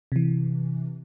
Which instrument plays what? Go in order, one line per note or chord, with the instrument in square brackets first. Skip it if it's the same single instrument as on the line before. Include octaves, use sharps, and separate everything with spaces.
[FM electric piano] C3 E3